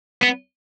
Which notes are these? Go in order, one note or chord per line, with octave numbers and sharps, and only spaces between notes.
B3